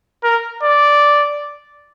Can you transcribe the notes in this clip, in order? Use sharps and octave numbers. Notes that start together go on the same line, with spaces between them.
A#4
D5